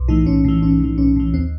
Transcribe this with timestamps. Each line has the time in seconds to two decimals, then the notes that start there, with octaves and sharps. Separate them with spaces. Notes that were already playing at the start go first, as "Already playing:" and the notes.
Already playing: B1
0.08 A2 E3 D#4
0.26 B1 C#4
0.45 A2 E3
0.62 B1 C#4
0.80 A2 E3
0.98 B1 C#4
1.16 A2 E3
1.33 D#2 C4